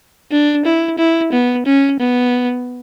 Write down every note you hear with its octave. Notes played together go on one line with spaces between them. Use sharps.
D4
E4
E4
B3
C#4
B3